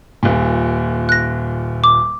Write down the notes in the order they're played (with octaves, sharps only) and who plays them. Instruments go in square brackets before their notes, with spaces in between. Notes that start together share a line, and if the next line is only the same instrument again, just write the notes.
[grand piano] D#1 A#2
[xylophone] F#6 A#6
D6